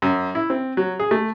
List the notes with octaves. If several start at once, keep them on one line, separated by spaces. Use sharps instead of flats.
F#2
E4
C4
F#3
G#4
A3